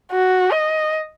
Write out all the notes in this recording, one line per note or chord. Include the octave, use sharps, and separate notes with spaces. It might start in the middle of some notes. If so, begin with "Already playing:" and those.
F#4
D#5